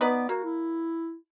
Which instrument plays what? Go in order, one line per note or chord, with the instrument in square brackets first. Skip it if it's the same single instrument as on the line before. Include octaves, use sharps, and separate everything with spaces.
[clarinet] B3 [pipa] D#4 B4 D5
[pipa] A#3 [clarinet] F#4
[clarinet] E4